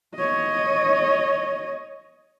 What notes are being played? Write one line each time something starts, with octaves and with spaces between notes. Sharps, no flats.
C#5 D#5